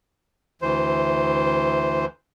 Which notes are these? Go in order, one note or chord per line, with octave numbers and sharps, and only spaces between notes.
D2 E3 C5